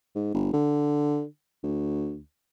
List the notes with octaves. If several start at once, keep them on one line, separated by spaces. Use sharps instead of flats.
G#2
G1
D3
D2